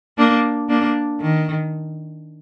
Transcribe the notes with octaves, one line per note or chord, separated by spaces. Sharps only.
A#3 D4
A#3 D4
D#3